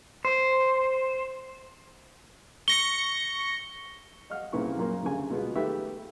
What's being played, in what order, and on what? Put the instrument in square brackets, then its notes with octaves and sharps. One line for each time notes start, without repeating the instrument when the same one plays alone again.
[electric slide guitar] C5
[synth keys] C#6 A#6 C#7 [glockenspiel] G7
[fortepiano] D#5 F5 F#5 F6
C2 A#2 C#3 E4 B4 C#6
F#2 A#2 A#3
D2 G2 C#3 G#5
B2 G#3 B3 F4
D#3 A3 G4 B4 E5